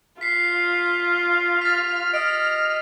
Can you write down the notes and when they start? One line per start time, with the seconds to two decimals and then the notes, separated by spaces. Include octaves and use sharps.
0.21 F4 B6 C7
1.61 F6 A6 B6
2.14 D#5 E6 D7